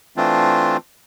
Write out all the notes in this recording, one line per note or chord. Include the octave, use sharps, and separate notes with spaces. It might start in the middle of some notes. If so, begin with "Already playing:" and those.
E3 A3 C4 D4 F4